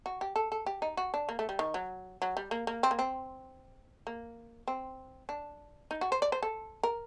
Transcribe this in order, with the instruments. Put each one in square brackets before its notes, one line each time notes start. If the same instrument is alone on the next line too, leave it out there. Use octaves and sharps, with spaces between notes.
[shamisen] F#4
G4
A4
A4
G4
D#4
F#4
D4
A#3
A3
G3
D#3
F#3
F#3
G3
A#3
A#3
C4
A#3
C4
A#3
C4
D4
D#4
F#4
C5
D5
C5
A4
A#4